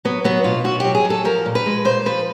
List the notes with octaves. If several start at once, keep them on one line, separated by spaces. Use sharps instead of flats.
F#3 B3
F#3 B3
B2 F4
B2 F#4
F#3 G4
G#4
F#3
A4
F3 A#4
A#2
B4
G#3
A#2 C5
F3 B4